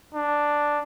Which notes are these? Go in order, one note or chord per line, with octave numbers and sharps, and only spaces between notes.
D4